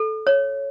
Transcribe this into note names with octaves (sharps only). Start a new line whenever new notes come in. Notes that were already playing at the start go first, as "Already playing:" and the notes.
Already playing: A4
C#5